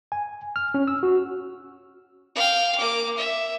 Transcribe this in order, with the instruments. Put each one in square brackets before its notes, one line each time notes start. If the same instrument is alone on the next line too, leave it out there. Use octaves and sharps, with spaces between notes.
[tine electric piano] G#5
F6
C#4
E6
F#4
[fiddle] F5 G5
A#3 D6
E5